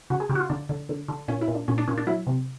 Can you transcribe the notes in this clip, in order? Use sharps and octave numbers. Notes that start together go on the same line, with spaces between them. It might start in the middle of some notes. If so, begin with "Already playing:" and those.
C#3 F#4
G#4
C#3 G4
F#4
F4
D3 D4
D3
D3
D3
A#2 C#4
E4
A#2
D4
A#2 C#4
D4
A#2 C#4
D4
F#3 E4
C3